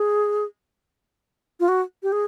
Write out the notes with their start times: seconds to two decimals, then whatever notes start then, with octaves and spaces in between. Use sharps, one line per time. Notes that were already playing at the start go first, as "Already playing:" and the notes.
Already playing: G#4
1.60 F4
1.68 F#4
2.03 G4
2.12 G#4